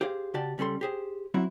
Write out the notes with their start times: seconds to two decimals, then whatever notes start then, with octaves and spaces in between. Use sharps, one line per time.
0.01 G4 G#4 C5 F5
0.34 C#3 F#4 G4 D5 A5
0.58 C#2 G3 C#4 A4 C6
0.81 G4 G#4 C5
1.34 F#3 C4 E4 F#4